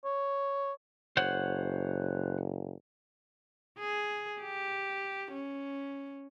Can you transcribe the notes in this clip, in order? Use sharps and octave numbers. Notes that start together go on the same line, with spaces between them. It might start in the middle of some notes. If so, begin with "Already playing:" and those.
C#5
F#1 C5 C#5 F#5
G#4
G4
C#4